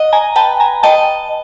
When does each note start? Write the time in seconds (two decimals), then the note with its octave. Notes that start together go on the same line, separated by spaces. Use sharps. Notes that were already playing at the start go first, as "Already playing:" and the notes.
Already playing: D#5 F#5
0.12 G#5 A#5
0.36 B4 G5 A5
0.60 G#5 A#5
0.83 D#5 G5 A5